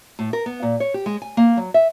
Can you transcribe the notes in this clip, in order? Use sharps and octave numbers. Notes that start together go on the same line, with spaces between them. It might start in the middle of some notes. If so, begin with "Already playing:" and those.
A2
A#4
B3
A#2
C#5
G4
G#3
G#5
A#3
F#3
E5